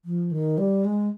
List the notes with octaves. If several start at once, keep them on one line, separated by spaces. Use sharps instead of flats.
F3
D#3
G3
G#3